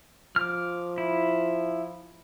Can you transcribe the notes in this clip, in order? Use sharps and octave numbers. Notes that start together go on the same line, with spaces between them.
F3 D6 F6
E4